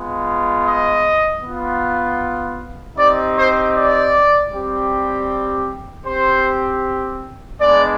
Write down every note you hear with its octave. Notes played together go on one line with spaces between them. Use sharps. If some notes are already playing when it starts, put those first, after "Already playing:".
Already playing: G#3 B3 F4
D#5
B3 F4
C4 D#4 G4 D5
C5
D5
G3 C4 G4
C4 G4 C5
G#3 B3 D4 D5